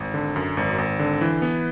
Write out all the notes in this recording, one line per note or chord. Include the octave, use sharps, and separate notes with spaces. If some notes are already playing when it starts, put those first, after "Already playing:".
Already playing: G#1
D3
F#2
G#1
G#1
D3
E3
B3